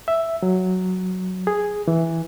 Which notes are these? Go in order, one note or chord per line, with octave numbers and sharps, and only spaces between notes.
E5
F#3
G#4
E3